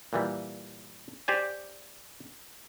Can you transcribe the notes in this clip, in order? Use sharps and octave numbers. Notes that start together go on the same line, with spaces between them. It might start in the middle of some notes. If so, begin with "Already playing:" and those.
A#2 E3 G3
G4 C5 D5 G#5